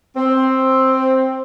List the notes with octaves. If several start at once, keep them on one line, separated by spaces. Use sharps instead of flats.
C4